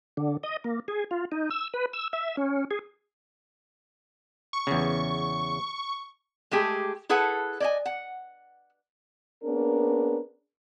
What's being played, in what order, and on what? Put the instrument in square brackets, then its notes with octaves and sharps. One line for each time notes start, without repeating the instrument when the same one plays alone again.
[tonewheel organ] D3
D#5
A#3
G#4
F4
D#4
E6
B4
E6
E5
C#4
G#4
[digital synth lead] C#6
[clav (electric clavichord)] E2 C#3
[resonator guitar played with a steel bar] G#3 A3 G4 G#4
E4 G#4 A4 B4 F#5
D5 D#5 G#5
F#5
[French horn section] A#3 B3 C#4 D4 G#4 A#4